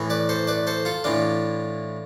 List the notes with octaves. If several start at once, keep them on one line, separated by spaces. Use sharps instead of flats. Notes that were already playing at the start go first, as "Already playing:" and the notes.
Already playing: A2 E3
B4 D5
A4 C5
B4 D5
A4 C5
F4 A4
A2 E3 D4 F4